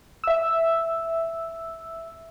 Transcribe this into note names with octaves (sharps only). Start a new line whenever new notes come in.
E5 E6